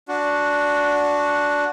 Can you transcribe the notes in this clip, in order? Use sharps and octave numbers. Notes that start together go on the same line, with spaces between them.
D4 F#4